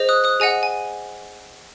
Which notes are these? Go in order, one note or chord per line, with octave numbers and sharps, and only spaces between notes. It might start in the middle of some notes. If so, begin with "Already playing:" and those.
Already playing: G#4 C5 D#5
D#6 F#6
D#6 F#6
G#4 D#5 F#5 G#5
G#5